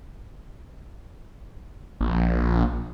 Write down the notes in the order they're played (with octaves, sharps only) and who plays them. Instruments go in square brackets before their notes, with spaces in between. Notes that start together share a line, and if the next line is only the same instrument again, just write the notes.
[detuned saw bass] A#1